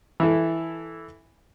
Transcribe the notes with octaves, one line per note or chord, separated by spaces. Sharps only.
E3 E4 A4